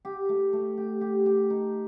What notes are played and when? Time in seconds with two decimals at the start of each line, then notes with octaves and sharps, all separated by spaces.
0.05 G4
0.29 A3
0.53 A3
0.77 G4
1.01 G4
1.26 G4
1.50 D#4